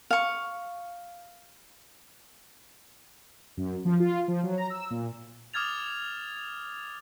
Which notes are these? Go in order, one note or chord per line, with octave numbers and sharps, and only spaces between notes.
F5 C#6
F#2
F3
F4
F3
F#3
A#5
E6
A#2
D6 D#6 F6 G#6 A6 F7